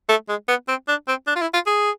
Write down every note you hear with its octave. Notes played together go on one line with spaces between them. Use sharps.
A3
G#3
B3
C4
D4
C4
D4
F4
E4
F4
G#4